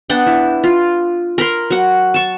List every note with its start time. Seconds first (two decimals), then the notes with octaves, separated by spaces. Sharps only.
0.10 B3 D4 F#5 G5
0.26 E4
0.64 F4
1.38 A#4 B5 C6
1.70 F#3 F#5
2.14 A5 C#6